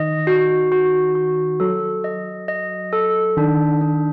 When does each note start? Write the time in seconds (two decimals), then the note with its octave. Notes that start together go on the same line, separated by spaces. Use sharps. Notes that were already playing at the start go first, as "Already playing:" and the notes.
Already playing: D#3 D#5
0.27 F#4
0.72 F#4
1.15 F#4
1.60 F#3 A4
2.04 D#5
2.48 D#5
2.93 A4
3.37 D#3 D4
3.81 D4